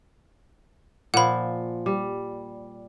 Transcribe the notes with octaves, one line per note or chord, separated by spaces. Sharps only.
A#2 F3 F#5 B5
G3